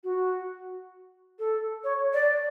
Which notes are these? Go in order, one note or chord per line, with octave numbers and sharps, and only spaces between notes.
F#4
A4
C#5
D5